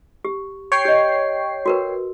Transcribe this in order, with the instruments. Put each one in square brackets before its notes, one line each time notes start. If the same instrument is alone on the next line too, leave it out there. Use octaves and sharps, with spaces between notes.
[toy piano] G4
[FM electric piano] C#5 G5 C7
[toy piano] G4 D#5
F#4 A#4 B4